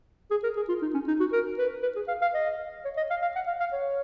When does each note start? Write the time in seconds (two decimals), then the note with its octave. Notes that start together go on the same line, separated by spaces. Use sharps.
0.31 G#4
0.43 A#4
0.57 G#4
0.69 F4
0.82 D#4
0.94 C#4
1.08 D#4
1.20 F#4
1.32 A#4
1.58 B4
1.83 B4
1.96 G#4
2.08 F5
2.22 F5
2.34 D#5
2.85 C#5
2.97 D#5
3.10 F5
3.22 F5
3.36 F#5
3.47 F5
3.60 F5
3.72 C#5